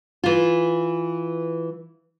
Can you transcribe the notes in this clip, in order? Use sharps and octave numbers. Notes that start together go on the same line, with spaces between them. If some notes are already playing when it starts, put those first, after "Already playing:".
E3 F4